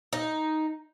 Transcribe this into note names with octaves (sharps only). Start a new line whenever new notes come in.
D#4